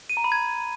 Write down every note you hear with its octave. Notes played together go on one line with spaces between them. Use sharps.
D#7
A#5
B5
G#6